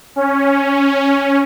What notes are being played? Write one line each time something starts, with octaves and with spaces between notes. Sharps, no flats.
C#4